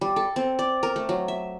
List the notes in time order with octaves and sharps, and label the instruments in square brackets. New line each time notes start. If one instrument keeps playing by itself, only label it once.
[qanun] G3
A4
C4
D5
A#4
A3
F#3
E5